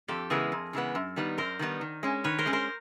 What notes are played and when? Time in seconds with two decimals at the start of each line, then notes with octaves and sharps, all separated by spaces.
0.08 F2 G4 A4
0.30 C#3 E3 G#3 B3 G#4 A#4
0.52 F2
0.73 C#3 E3 G#3 B3
0.95 F#2
1.16 D#3 G3 B3 D#4
1.38 F#2 A#4 C5
1.59 D#3 G3 B3 D#4
1.81 D#3
2.03 G#3 C#4
2.24 D#3 B4 C#5
2.38 A#4 C5
2.46 G#3 C#4
2.53 A#4 C5